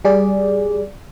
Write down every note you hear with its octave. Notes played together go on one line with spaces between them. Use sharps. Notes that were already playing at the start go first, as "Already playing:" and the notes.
G3 G#4 D5